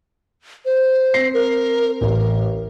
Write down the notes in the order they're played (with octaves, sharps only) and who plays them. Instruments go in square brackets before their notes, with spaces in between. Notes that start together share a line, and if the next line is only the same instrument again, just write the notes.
[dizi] C5
[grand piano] C4 A#6 C7
[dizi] A#4
[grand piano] A1 [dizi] A#4